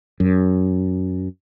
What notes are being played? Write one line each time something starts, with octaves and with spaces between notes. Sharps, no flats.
F#2